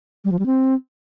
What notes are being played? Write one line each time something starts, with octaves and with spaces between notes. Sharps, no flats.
G3
F3
G3
C4